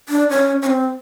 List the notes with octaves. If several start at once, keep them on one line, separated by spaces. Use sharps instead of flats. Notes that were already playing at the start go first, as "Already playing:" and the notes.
D4
C#4
C#4
C4